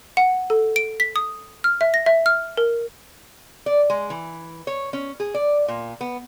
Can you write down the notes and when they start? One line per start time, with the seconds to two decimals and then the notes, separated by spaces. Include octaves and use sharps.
0.17 F#5
0.50 A4
0.76 D7
1.00 B6
1.16 D#6
1.64 F6
1.81 E5
1.94 A#6
2.06 E5
2.26 F6
2.57 A#4
3.66 D5
3.90 G#3
4.10 E3
4.67 C#5
4.93 C#4
5.20 G#4
5.34 D5
5.68 A#2
6.01 B3